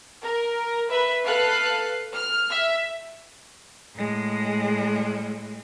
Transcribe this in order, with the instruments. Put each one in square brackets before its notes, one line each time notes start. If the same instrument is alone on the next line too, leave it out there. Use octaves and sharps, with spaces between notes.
[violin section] A#4
B4 E5
A4 B4 F5 F#6 C7
F6
E5
[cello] A2 G#3